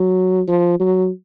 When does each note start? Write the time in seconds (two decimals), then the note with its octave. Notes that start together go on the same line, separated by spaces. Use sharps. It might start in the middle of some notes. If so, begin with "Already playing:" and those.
Already playing: F#3
0.48 F3
0.80 F#3